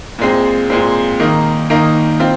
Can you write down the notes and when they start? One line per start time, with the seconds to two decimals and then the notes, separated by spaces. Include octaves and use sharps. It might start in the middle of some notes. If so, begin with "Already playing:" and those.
0.19 A#2 G#3 C4
0.70 A#2 G#3 C4
1.20 D#3 A#3 D#4
1.70 D#3 A#3 D#4
2.20 C4 F4